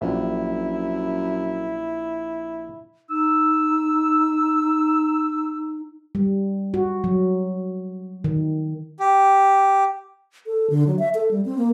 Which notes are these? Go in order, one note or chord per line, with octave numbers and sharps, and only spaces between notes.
A#1 F#2 E4
D#4 E6
G3
F#4
F#3
D#3
G4
A4
D3
F#3
E5
A4
G3
C4
A#3